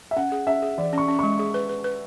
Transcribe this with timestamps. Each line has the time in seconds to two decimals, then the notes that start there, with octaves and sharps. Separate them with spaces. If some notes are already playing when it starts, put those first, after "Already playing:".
0.11 E5
0.17 C#4 F#5
0.32 G#4
0.47 C#4 E5
0.62 G#4
0.78 E3 D5
0.93 C#4 C#6
1.08 C#4
1.19 G#3 C#6
1.39 G#4
1.54 B4
1.69 B4
1.84 B4